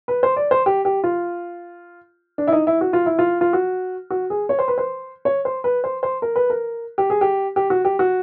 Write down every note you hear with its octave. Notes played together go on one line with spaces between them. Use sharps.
B4
C5
D5
C5
G4
G4
F4
D4
E4
D#4
E4
F#4
F4
E4
F4
F4
F#4
F#4
G#4
C#5
C5
B4
C5
C#5
C5
B4
C5
C5
A#4
B4
A#4
G4
G#4
G4
G4
F#4
G4
F#4